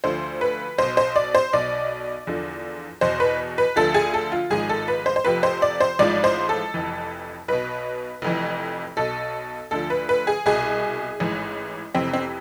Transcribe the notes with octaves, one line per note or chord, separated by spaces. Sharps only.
D2 D3 F3 C5
B4
B1 B2 C5
C5
D5
C5
B1 B2 D5
E2 D3 F3
E2 B2 C5
B4
B4
D2 D3 F3 A4
G#4
A4
F4
G#1 G#2 F3 G#4
A4
B4
C5
C5
F1 F2 C3 F3 B4
C5
D5
C5
A1 G#2 F3 D5
C5
A4
F1 F2 E3
B1 B2 B4
F1 F2 E3
B1 B2 A4
D2 D3 F3 A4
B4
B4
G#4
C2 B2 G#4
A1 G#2 E3
F1 F2 C3 E3 C4
C4